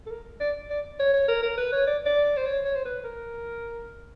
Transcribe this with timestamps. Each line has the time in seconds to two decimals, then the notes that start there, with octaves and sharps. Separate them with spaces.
0.06 A4
0.11 A#4
0.40 D5
0.70 D5
1.00 C#5
1.14 C#5
1.28 A#4
1.43 A#4
1.58 B4
1.73 C#5
1.87 D5
2.06 D5
2.37 C5
2.46 C#5
2.65 C#5
2.75 C5
2.85 B4
3.04 A#4